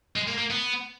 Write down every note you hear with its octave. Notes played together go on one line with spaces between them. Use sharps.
G#3
A#3
A#3
B3